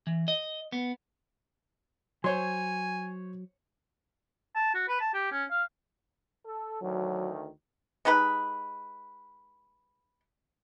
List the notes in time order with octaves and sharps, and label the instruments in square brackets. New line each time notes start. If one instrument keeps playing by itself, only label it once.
[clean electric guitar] E3
D#5
B3
[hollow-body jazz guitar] F#3 [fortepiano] C5 C#5 C6 [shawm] G#5
[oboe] A5
F#4
B4
A5
G4
C#4
F5
[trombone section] A4
[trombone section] D2 D#3 [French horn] F#3
[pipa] G#3 D#4 G4 B4